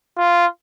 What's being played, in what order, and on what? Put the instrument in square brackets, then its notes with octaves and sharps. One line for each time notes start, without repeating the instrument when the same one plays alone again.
[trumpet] F4